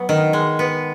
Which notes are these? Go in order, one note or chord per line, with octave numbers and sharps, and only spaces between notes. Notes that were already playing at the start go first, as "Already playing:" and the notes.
Already playing: F#3 B3
D#3
G#3
B3